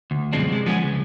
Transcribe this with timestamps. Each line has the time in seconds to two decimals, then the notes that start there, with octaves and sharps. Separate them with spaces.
0.11 D2
0.33 F#2 B2 F3 G#3 C4 D4
0.50 C3 G#3
0.66 F3 G#3 B3 C#4 G#4
0.83 C#2